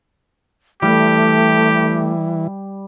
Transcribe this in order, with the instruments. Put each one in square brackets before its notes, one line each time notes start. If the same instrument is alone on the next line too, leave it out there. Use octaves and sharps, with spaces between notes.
[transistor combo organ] E3 [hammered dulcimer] G3 [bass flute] A3 [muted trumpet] G4